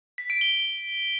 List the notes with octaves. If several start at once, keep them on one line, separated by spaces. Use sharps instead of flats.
B6
D7
G7